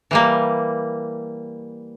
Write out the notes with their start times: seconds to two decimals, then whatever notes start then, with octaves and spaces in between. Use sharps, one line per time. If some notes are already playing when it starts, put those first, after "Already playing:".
0.11 E3 G3 A#3